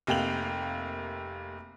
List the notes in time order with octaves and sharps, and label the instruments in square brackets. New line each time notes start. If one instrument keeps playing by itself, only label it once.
[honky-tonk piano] F1 C3 A#3 G5 F7 F#7